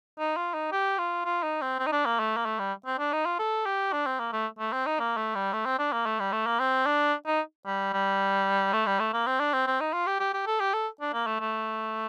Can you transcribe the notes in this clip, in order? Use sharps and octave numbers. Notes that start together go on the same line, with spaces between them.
D#4
F4
D#4
G4
F4
F4
D#4
C4
C4
D#4
D4
A#3
A3
A#3
A3
G3
C4
D4
D#4
F4
A4
G4
D4
C4
A#3
A3
A3
C4
D#4
A#3
A3
G3
A3
C4
D4
A#3
A3
G3
A3
A#3
C4
D4
D#4
G3
G3
A3
G3
A3
A#3
C4
D4
C4
C4
D#4
F4
G4
G4
G4
A4
G4
A4
D4
A#3
A3
A3